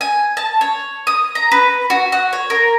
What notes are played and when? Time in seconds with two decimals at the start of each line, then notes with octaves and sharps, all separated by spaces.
0.01 G#5
0.37 A5
0.61 C#5
1.07 D#6
1.35 A#5
1.52 B4
1.90 F#4
2.12 F#4
2.33 C#5
2.50 A#4